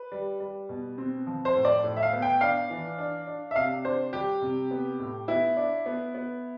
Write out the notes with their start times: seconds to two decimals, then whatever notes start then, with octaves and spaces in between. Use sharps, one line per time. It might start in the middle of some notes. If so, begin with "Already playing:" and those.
Already playing: B4
0.12 G3
0.40 G3
0.69 B2
0.98 C4
1.27 F3
1.45 C5
1.55 A2
1.65 D5
1.84 A2
1.97 E5
2.03 F5
2.13 B3
2.22 G5
2.41 D4 F5
2.70 E3
2.98 D4
3.27 D4
3.51 E5
3.56 C3 F5
3.85 D4 C5
4.13 G3 G4
4.42 C3
4.71 B3
4.99 A2
5.28 B3 E4
5.57 D4
5.86 B3
6.15 B3